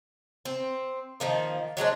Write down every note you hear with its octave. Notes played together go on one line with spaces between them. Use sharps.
C4
D#3 F3 A#3
F#3 G#3 C4 D4